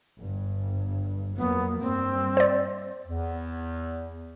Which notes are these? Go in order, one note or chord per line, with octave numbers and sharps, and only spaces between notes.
G1 G2
F2 F#3 A#3 B3
G2 G3 C4
C5 D5
E2